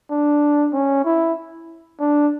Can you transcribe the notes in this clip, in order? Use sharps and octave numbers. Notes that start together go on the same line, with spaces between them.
D4
C#4
E4
D4